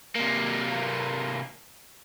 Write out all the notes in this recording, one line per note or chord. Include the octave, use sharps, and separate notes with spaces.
C3 A#3